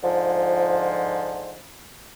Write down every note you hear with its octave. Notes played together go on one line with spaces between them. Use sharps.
G#2 D3 F3